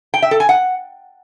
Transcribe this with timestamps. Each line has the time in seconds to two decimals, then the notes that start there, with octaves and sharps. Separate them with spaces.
0.14 G5
0.22 E5
0.31 A4
0.40 G#5
0.49 F#5